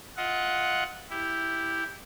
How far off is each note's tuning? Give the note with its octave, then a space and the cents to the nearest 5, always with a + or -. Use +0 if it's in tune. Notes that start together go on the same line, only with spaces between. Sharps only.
F4 +0 D#5 +35 F#5 +0
E4 +0 G4 +5